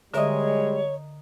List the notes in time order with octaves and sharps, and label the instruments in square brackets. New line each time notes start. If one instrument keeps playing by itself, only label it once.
[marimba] D3 E5 [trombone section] G3 G#3 [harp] A#4 D#5 [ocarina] C#5